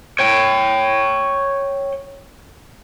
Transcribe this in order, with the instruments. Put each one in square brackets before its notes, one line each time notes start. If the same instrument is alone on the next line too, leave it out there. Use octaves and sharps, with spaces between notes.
[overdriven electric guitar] C#5 G5